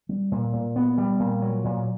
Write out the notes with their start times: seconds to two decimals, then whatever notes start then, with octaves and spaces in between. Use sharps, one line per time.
0.09 G3
0.32 A#2
0.53 A#2
0.76 B3
0.98 G3
1.19 A#2
1.42 F#3
1.64 A#2